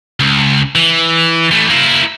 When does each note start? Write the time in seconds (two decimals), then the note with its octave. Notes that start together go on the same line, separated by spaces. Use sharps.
0.20 C#2
0.75 E3
1.51 E3 A3
1.69 A#3 E4